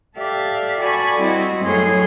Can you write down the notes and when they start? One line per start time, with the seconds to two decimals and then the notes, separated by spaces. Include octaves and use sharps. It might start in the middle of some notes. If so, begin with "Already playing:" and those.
0.17 G4 A4 D5 E5 F5
0.79 F#4 A4 D5 G#5 B5 C#6
1.18 G3 C4 E4 F#4 D#5
1.64 F#2 A2 E4 G#4 C#5 C6